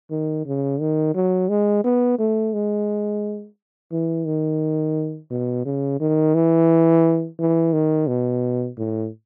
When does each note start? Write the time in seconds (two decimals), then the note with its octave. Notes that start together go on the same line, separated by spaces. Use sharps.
0.10 D#3
0.46 C#3
0.80 D#3
1.15 F#3
1.49 G#3
1.84 B3
2.19 A3
2.53 G#3
3.92 E3
4.26 D#3
5.30 B2
5.65 C#3
6.00 D#3
6.35 E3
7.39 E3
7.73 D#3
8.07 B2
8.77 A2